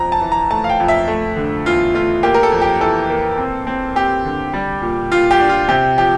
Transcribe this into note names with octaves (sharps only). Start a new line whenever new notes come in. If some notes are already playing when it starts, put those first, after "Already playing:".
Already playing: F2 A#5
A5
E3
A#5
A3 A5
F5
G5
F2
E5
A3
D3
E2 F4
A3 F4
A#3 G4
A#4
A4
F2
G4
E3 A4
A#3
C4
C4
C4 G4
D3
G3
A#2
A#2 F4
G4
D4
F4
C3 G4
F3 G4